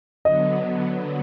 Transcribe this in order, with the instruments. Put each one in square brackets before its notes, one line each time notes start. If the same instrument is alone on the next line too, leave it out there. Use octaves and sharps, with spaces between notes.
[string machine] D3 F#3 B3 [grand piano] D#5